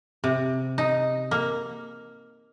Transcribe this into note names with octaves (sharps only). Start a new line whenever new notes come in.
C3
D#4
A#3